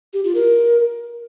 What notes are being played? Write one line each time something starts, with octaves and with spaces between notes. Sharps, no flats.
G4
F4
A#4